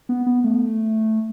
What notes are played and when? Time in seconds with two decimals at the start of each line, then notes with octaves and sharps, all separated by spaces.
0.09 B3
0.26 B3
0.44 A3